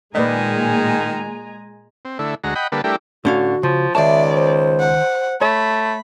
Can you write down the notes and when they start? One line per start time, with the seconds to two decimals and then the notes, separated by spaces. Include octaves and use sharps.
0.15 A#2 D#3 G#3 B4 D5 D#5 G#5 A#5
2.05 C4
2.19 D3 A3 E4
2.44 D2 G#3 F#4 A#5
2.55 D#5 F#5 G5 B5
2.72 D3 G3 A#3 A4 B4
2.84 G3 A3 D4 E4 G4 A#4
3.25 A2 D3 C#4 F#4 F5
3.63 C#3 F3
3.95 C#2 D#3 D5 E5 A5
4.33 C5
4.80 F#5
5.42 A3 C#5 B5